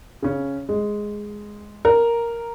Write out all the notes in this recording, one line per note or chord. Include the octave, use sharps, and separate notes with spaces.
C#3 C#4
G#3
A#4